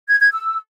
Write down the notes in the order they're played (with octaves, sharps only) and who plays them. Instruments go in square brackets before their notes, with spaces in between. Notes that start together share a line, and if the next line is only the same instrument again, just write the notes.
[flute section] G#6
G#6
E6